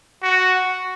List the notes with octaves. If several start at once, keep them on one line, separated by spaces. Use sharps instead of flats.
F#4